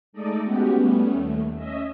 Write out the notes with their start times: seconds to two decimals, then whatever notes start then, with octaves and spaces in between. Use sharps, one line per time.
0.13 G#3 A3 D#4 A4 D5 D#5
0.43 G#3 B3 C#4 F#4 G4
0.72 G3 A3 B3 C#4
1.13 D#2 A3
1.55 C#4 D#5 E5